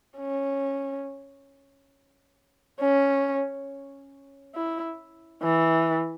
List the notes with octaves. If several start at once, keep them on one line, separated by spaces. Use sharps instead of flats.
C#4
C#4
E4
E3